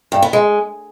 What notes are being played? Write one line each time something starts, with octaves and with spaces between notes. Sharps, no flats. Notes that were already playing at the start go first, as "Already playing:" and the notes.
G2
B3
G#3